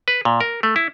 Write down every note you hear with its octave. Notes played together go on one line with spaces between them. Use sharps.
B4
A#2
A#4
A3
E4